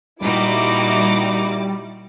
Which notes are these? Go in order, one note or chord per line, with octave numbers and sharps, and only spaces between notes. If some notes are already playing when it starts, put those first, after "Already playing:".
A#2 G3 D#4 E4 F#4 D6